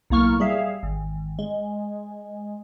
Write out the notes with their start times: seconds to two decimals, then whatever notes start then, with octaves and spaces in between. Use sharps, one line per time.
0.10 B1 A2 A#3 C#6 F6
0.40 G3 G#4 E5 F5
0.83 G#1
1.39 G#3